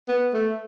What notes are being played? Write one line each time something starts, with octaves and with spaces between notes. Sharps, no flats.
B3
A3